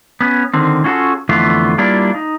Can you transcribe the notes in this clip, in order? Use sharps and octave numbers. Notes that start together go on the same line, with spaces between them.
B3 C#4
D3 D#3 C4
C#4 F4 F#4 G#4 A4
F2 D3 E3 A3 B3 F4
G3 A#3 D4 E4 F4 D5
D#4